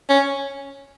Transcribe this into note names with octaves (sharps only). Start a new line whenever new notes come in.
C#4